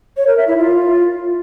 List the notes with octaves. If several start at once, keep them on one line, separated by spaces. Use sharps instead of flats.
C#5
A#4
E5
E4
F4